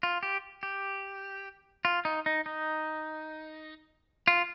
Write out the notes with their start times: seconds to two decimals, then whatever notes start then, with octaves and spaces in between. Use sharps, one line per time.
0.03 F4
0.23 G4
0.63 G4
1.85 F4
2.05 D#4
2.26 D#4
2.46 D#4
4.28 F4